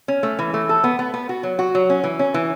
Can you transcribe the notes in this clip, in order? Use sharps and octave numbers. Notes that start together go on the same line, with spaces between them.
C#4
A3
E3
A3
A4
B3
B3
B3
F#4
F#3
F#4
F#3
C#4
E3
C#4
E3